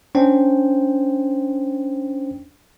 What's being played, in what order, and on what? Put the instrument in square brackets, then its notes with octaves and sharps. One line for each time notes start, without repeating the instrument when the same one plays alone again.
[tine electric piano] C#4 D4 C5 G5